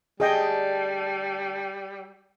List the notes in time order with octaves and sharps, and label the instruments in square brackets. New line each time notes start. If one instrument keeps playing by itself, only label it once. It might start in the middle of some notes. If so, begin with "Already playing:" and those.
[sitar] D3 A3 [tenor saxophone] G3 [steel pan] G#4 D#5 G5